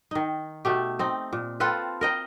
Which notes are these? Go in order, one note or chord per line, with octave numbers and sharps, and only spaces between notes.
D#3 D#4
B2 A3 G4
C4 D#4
A#2
C4 F4 A4 B4
A#4 D#5 G5